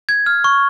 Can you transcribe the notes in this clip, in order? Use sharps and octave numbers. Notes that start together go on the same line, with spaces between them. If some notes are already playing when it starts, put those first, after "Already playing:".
G#6
F6
C#6